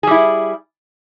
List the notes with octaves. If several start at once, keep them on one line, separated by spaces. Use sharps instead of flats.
G3 E4 G#4